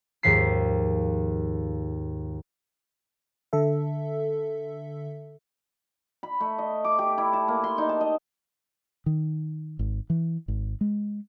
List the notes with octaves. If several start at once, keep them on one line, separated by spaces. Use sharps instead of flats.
D#2 G#2 F3 B6 C7
D3 A4 E5
B5
A3
D#5
D6
G4
E4
A5
A#3
C6
D#4
A5
D#5
D#3
G#1
E3
G#1
G#3